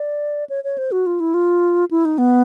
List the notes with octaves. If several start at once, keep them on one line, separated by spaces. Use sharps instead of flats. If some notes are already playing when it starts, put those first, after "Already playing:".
Already playing: D5
C#5
C#5
C5
F#4
F4
E4
F4
E4
D#4
B3